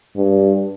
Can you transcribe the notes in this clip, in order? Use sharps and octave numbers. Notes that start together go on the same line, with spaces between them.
G2